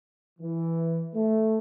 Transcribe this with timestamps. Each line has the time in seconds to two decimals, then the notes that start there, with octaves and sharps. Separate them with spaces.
0.40 E3
1.15 A3